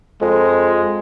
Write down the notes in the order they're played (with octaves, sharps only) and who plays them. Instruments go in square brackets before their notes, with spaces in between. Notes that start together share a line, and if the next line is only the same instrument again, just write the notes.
[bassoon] F2 [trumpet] G#3